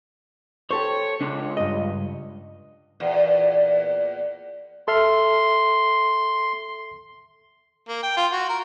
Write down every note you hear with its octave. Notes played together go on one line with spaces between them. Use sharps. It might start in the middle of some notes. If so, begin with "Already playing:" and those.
G4 A4 C5 C#5
C#2 D4
G2 D#5
E2 A#2
A4 E5 C6 F6
A#3
G5
F4
F#4
A#4